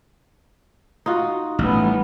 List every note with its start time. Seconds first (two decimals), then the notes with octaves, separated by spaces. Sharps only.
1.06 D#4 F4 F#4
1.59 A1 G3 B3